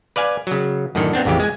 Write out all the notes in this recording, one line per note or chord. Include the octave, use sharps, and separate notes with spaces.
B4 D5 F5 G#5
C#3 F#3
F#2 A2 D3 D#3
B3 C4 D4
A1 F2 C#3 E3 G4
G#3 G#5